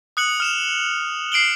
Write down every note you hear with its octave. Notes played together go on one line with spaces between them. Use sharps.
D#6 F#6 C#7 F#7
F6 E7 F7
C7 D7 F#7 G7